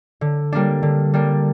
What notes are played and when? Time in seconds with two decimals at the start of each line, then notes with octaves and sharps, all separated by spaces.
0.21 D3
0.52 G3 A#3 D4
0.83 D3
1.14 G3 A#3 D4